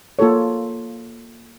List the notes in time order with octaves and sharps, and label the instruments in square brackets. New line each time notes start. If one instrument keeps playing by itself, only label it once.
[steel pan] A#3 F4 A4 C#5